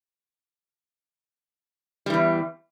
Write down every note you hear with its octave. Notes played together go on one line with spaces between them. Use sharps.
E2 E3 G3